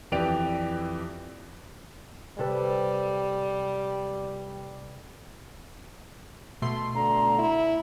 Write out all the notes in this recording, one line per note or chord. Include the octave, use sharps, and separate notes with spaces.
F2 E3 G4 D5 D7 F7
C3 G3 A4 B4
B2 A3 C6
D3 A#5
E4